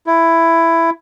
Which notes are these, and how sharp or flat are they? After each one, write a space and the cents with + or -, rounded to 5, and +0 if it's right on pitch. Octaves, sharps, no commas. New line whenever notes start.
E4 +10